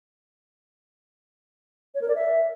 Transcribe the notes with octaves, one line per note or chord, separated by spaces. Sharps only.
C#5
A#4
D5
E5